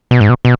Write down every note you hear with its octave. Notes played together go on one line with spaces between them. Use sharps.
B2
G#2
B2
B2